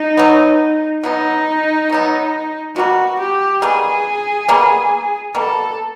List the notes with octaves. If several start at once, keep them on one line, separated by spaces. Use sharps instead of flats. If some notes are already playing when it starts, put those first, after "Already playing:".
Already playing: D#4
B2 F#3 B3
B2 F#3 B3 D#4
B2 F#3 B3
B2 G3 A#3 F#4
G4
B2 G3 A#3 G#4
B2 G3 A#3
B2 G3 A#3 A4